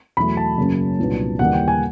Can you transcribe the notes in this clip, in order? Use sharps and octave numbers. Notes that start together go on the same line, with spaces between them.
E2 B2 F#3 A3 B5
A5
F#2 C#3 F#3 A#3 C#4
C2 A#2 F#3 B3 D4
D#2 C#3 E3 G3 A#3 F#5
G5
G#5